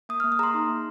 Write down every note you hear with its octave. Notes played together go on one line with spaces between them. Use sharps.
A#3 D#6
F6
A#3
D#6
G#4 A#5 C6
D#4
A#3